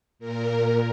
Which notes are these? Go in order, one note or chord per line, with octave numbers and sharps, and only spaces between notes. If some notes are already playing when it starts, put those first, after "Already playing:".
A#2 A#4